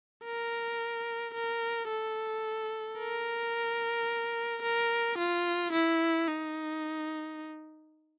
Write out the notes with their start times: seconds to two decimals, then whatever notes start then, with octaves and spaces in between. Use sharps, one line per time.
0.24 A#4
1.34 A#4
1.88 A4
2.98 A#4
4.63 A#4
5.18 F4
5.73 E4
6.28 D#4